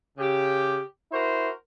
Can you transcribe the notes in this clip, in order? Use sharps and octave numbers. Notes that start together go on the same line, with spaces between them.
C#3 G4
E4 F#4 A#4 C5